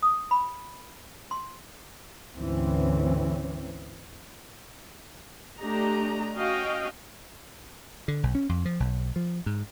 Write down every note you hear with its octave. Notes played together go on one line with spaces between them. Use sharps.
D#6
B5
C6
D2 G#2 D3 E3 C4 C#4
A3 D4 G4 D#5 A#5
C#4 F#4 D#5 F5 G5
D3
B1
C#4
F2
F3
B1
F3
G#2